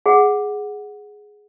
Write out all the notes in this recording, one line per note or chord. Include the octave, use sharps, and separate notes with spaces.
G#4 F#5